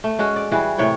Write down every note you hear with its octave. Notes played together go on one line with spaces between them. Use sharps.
A3
G#3 C#4 F#4
D5
E3 G3 F#4 G#4
A2 C3 C#5 G5